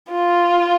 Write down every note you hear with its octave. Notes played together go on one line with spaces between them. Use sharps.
F4